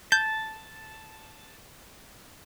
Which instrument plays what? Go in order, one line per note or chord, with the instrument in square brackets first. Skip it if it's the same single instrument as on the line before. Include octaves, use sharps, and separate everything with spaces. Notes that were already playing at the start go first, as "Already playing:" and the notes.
[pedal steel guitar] A5 [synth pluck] G6